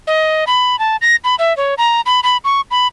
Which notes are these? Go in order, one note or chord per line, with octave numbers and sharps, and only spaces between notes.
D#5
B5
A5
A#6
B5
E5
C#5
A#5
B5
B5
C#6
B5